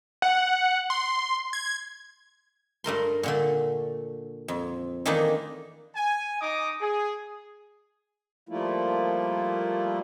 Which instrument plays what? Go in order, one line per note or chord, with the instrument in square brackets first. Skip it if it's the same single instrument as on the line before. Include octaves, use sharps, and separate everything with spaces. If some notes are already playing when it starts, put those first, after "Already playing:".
[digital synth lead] F#5
C6
G#6
[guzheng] G2 A3 A#4 C6
A#2 D3 A3
F2
D#3 E3 A3 A#3 D4 D#4
[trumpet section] G#5
D#4 D#5 A#5 D6 D#6
G#4
[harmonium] F3 G3 A3 A#3 E4 F4